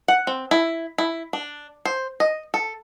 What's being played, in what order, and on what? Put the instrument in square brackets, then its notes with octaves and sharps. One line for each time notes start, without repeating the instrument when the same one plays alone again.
[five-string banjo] F#5
C4
E4
E4
D4
C5
D#5
A4